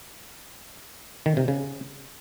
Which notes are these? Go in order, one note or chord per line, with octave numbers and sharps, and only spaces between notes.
D#3
C3
C#3